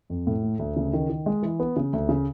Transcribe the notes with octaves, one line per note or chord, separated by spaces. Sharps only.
F2
A2
A3
D2
C#3
D#3
D#3
G#3
E3
B3
C#3
D2
C#3